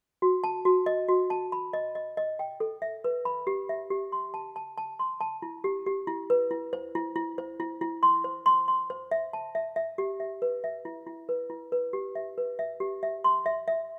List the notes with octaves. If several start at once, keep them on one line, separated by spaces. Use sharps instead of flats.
F#4
A5
F#4
D#5
F#4
A5
B5
D#5
D#5
D#5
G5
A4
E5
B4
B5
G4
E5
G4
C6
A5
A5
A5
C6
A5
E4
G4
G4
E4
B4
E4
C5
E4
E4
C5
E4
E4
C6
C5
C6
C6
C5
E5
A5
E5
E5
G4
E5
B4
E5
E4
E4
B4
E4
B4
G4
E5
B4
E5
G4
E5
C6
E5
E5